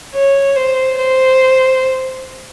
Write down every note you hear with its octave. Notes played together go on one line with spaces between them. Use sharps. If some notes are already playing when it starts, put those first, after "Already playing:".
C#5
C5
C5